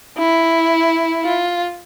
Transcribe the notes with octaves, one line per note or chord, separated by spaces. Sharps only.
E4
F4